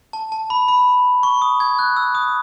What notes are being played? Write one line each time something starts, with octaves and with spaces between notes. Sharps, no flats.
A5
A5
B5
B5
C#6
D#6
G#6
F#6
E6
D#6